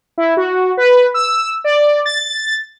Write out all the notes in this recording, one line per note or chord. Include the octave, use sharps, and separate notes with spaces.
E4
F#4
B4
E6
D5
A6